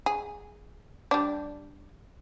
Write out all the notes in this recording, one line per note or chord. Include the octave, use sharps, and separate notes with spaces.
G#4
G3 D4